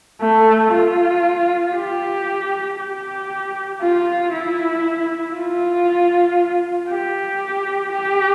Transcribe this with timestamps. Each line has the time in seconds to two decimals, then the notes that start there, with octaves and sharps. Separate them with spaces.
0.21 A3
0.73 F4
1.76 G4
2.79 G4
3.81 F4
4.33 E4
5.35 F4
6.90 G4
7.92 G4